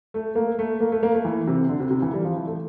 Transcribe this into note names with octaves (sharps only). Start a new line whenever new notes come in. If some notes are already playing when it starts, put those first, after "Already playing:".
A3
A#3
A3
A#3
A3
A#3
A3
E3
C3
D3
C3
C3
E3
G3
F3
E3
A3